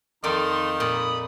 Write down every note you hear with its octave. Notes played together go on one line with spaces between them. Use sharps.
F2 D#3 A#3 D#4 D5 C6
A#2 B5 D#6